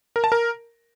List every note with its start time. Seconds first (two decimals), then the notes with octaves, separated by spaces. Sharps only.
0.16 A#4
0.24 A5
0.32 A#4